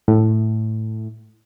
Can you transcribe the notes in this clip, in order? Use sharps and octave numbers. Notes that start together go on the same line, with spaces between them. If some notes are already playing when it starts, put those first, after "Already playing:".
A2